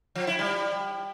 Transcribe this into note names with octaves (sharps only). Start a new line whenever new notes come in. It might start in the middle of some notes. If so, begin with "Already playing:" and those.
F3
E4
G3